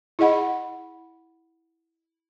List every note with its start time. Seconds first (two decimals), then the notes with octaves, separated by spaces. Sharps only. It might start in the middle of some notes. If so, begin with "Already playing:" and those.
0.19 E4 G#4 D#5 F#5 B5